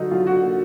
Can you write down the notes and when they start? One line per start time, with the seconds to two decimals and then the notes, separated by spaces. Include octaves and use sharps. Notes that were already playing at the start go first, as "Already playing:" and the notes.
Already playing: D3 F#3 D#4
0.11 F#3 F4
0.27 F#4
0.43 A#3